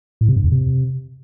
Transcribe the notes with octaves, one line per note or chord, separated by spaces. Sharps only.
A2
C3
G2
E2
C3